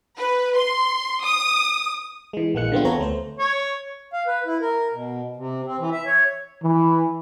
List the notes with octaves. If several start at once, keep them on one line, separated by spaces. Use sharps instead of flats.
B4
C6
D#6
E3 G#3
A#1 E3 G#3 A#3 F#6 C#7
D3 B3 C4 F4
E2 B3 C4 A4 C#5 A#5
D2 A3 C5
C#5
F5
B4
E4
A#4
B2
C3
C4
E3
E5
C#5
E3